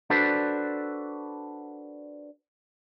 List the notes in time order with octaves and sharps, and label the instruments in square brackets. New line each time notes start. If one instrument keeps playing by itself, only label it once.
[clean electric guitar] D4 F#4 A4 B4 C5 D5